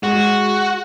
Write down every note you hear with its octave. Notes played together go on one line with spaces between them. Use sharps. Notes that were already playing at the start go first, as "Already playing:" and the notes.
G#3 F#4